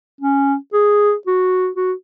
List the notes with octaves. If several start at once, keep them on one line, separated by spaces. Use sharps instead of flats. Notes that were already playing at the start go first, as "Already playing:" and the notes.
C#4
G#4
F#4
F#4